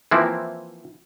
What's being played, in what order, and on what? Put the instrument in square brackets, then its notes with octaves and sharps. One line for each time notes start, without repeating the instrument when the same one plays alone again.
[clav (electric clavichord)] E3 F3 A#3 C4 E4